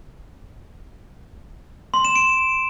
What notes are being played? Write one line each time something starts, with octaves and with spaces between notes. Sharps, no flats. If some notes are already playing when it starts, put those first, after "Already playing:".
C6
E7
D7